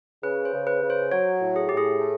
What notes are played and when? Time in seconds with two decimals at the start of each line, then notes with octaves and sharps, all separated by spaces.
0.23 C#3 B4
0.45 C5
0.53 C#3
0.67 B4
0.82 C#3
0.90 C5
1.12 F#3 C#5
1.41 A2
1.56 G#4
1.69 A2 G4
1.77 G#4
2.00 A3